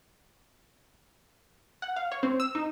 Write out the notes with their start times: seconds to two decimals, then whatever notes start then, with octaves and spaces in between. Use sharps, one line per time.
1.82 F#5
1.96 F5
2.12 C#5
2.23 C4
2.40 E6
2.55 D#4